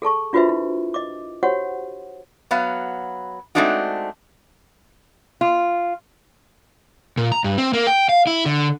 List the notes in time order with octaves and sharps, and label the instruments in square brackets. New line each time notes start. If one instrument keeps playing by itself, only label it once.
[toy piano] G#4 A4 A5 C#6
D4 F4 F#4 B4 C5 E5
E4
D#5 D6
F#4 G4 C5 C#5 F#5
[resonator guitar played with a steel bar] F#3 B3 F5
G#3 A3 C4 D4 D#4 F#4
F4
[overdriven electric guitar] A#2
A#5
G2
C4
A#3
G5
F5
E4
D3